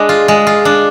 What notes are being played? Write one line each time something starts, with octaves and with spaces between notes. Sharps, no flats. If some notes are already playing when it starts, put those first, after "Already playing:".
Already playing: G#3 D4
F4
G#3
F4
D4